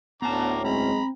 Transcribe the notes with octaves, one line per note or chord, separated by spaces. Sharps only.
D2 A2 D3 B3 C#4 A5 A#5 D6
B1 G#3 C4 A#5 B5